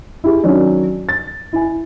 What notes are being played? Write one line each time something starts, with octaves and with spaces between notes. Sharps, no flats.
E4 G4 G#4
D#3 F#3 C#4 D4
A6
E4 G#5